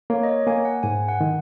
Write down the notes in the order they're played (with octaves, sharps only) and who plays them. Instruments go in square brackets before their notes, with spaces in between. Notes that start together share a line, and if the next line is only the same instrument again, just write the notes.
[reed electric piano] A#3 [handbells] C#5
[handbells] D#5
C#5
[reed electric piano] A#3 [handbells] G#5
[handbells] F#5
[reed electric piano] G#2 [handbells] G#5
[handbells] F#5
[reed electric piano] D#3